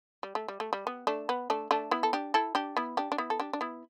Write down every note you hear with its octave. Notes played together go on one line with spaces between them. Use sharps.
G3
A3
G3
A3
G3
B3
A3 D4
B3
A3 D4
A3 D4
B3 E4
A4
D4 G4
E4 A4
D4 G4
B3 E4
D4 G4
D4
B3 E4
A4
D4 G4
D4
B3 E4